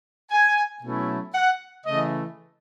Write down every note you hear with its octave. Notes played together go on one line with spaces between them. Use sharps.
G#5
B2 F#3 A3 C#4 E4
F#5
C#3 E3 A3 D#5